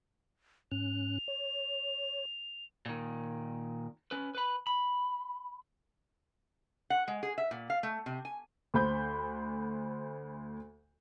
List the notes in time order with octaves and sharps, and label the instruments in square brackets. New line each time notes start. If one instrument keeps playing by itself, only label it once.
[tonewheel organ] G#2 C#4 F#6 [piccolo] F7
[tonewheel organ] C#5
[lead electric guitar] A#2 D#3
C#4 B4
B4 B5
B5
[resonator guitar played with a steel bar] F#5
G#3
G#4
E5
A#2
F5
A3
C3
G#5
[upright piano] D2 C5 B5 G6